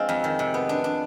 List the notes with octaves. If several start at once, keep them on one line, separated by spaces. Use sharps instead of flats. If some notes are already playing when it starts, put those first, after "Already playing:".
Already playing: F3 G#3 C4 D4 F4
F2
D#3
C3
B3
D4
D4